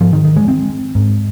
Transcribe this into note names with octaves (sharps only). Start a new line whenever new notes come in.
G#2 F3
D#3
D#3
G#3
C4
G#2